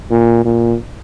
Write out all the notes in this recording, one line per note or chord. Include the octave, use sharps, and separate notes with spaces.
A#2
A#2